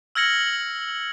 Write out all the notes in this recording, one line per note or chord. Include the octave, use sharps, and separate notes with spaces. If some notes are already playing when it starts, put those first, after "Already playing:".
E6 F6 G#6 A#6 C#7 F#7